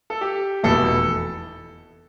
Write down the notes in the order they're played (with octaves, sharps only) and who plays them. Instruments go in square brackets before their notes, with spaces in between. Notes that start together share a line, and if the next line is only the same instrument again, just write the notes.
[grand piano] A4
G4
F1 E2 B2 A4